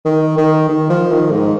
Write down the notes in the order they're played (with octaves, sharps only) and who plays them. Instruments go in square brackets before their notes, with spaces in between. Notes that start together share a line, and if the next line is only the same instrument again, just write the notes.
[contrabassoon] D#3
D#3
D#3
F3
D#3
G#2